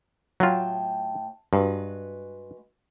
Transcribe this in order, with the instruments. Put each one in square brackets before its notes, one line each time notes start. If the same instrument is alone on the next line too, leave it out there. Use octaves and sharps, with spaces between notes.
[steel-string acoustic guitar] A2 G5 A5 [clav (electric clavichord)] F#3 F4
[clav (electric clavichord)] G2 [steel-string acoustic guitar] G#3 F#4 B4